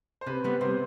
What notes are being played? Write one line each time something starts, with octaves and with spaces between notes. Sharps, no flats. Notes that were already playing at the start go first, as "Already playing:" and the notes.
C5
C3 B4
G3 B3
C3 C5